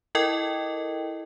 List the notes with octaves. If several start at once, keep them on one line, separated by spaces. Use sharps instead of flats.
E4 A4 A#4 D#5 G5